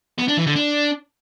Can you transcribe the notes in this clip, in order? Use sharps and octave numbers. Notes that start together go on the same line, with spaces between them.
B3
D4
E3
D3
D4